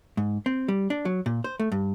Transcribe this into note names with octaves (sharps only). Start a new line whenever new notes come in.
G#2
C4
G3
D4
F#3
A#2
C5
A3
G2